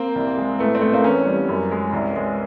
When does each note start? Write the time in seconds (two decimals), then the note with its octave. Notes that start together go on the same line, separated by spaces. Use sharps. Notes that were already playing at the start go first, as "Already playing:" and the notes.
Already playing: A#3 C4
0.15 C2
0.37 G#3
0.59 A2 A3 B3
0.75 C4
0.81 A2 A3 B3
0.93 A#3 C4
1.04 E2 B3 C#4
1.26 G3
1.49 F#2
1.71 G#3
1.93 C2
2.16 G#3